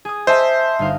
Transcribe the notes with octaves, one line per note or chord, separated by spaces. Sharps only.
G#4 D#6
C5 D#5 E5 A5
G1 D#4 F5